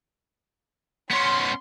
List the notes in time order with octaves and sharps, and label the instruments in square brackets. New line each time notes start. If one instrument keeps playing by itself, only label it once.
[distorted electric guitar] B3 C#4 [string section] C6